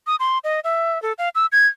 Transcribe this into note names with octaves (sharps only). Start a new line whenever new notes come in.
D#6
C6
D#5
E5
A4
F5
E6
G#6